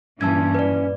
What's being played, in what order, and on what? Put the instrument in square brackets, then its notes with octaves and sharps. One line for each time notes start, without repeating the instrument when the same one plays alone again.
[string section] G2 A#2 E3 [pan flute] C#4 [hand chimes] A5 E6 G#6
[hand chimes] B4 D5